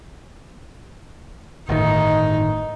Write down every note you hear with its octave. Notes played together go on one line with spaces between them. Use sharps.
G1 A2 D#3 D#4